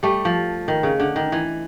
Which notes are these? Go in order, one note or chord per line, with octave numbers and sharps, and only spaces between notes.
G3 A3
F3
D#3
C#3
D3
D#3
E3